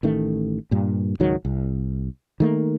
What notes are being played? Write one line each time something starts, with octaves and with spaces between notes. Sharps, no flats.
A1 D#3 A3
G2 A#2
C#2 G#2 D#3 F#3
C2
D#3 A3 A#3